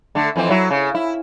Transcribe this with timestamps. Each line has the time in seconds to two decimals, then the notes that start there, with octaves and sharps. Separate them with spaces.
0.15 D3 A3
0.36 F2 E3 C4
0.50 F#3 E4
0.71 C#3
0.95 E4